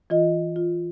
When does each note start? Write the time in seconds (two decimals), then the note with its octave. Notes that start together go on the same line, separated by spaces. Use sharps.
0.10 E3 F4 D#5
0.56 F4